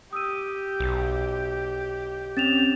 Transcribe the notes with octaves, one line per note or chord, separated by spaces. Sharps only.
G4 D#6 E6 D#7
B1
C4 C#4 A6 E7 F7